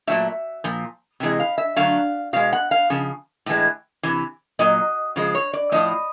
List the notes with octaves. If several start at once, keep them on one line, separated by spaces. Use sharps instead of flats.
A#2 F#3 A3 E5
A#2 F3
C3 E3 G#3
F5
E5
D3 F#3 A3 F5
B2 G#3 F5
F#5
F5
C#3 F3
A2 E3 G#3
C3 E3
A#2 F#3 D#5
C#3 F3 G#3
C#5
D5
A2 F3 A3 D#5